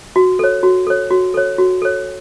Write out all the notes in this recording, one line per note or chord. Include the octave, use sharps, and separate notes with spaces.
F#4
A4 C#5
F#4
A4 C#5
F#4
A4 C#5
F#4
A4 C#5